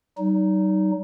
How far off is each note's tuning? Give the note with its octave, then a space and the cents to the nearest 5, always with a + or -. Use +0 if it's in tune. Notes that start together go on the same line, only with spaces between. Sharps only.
G3 -45 D#4 -5